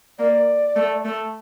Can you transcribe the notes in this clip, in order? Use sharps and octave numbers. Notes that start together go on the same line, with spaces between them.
A#3 D5
A3
A3